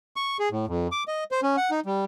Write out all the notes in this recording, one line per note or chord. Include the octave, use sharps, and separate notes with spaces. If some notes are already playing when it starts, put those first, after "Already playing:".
C#6
G#4
A2
F2
D6
D#5
C5
C#4
F#5
D#4
G3